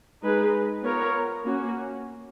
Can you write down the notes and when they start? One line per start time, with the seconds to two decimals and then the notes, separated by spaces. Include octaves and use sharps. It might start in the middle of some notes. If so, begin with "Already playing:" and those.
0.23 G#3 D#4 G#4 B4
0.83 B3 F4 A#4 C#5
1.44 A#3 C#4 F#4